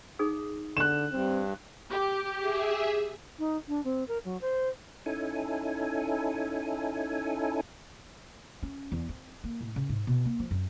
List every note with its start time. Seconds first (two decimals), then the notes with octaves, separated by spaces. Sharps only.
0.19 D#4 G#4 D#6
0.77 D3 F#6 E7
1.12 G2 C4
1.90 G4
2.37 G#4 E5
3.39 D#4
3.68 D4
3.84 C4
4.08 A#4
4.24 F#3
4.41 C5
5.06 C#4 D#4 E4 A4 G#5
8.63 C#4
8.92 E2
9.09 C4
9.44 A#3
9.61 A2
9.76 C#3
9.90 G#2
10.07 B2
10.25 A#3
10.40 F3
10.51 F#2